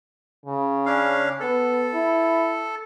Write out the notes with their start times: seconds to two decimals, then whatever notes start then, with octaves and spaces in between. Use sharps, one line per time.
0.46 C#3
0.86 C#4 D4 F5
1.40 B3 A4
1.94 E4